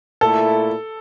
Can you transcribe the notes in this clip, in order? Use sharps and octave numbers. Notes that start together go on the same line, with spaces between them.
A#2 A3 E4 A4